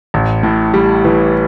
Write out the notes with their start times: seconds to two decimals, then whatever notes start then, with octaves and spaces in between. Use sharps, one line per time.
0.14 A1
0.43 A2
0.74 G3
1.04 E3